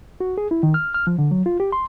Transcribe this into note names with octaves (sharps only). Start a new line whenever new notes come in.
F#4
G#4
E4
D#3
F6
F6
F3
D3
F#3
F4
G4
C6